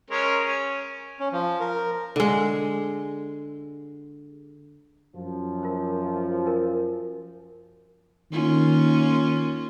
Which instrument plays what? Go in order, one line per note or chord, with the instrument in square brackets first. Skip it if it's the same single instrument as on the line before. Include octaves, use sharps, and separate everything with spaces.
[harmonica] G#3 C#4 A#4
C#4
[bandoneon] C#4
F3
A#4
[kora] D3 G#3
[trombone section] F#2 F3
[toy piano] F4 A#4 C5
A#4 D#5 G#5
[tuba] D#3 [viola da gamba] A#3 C#4 F4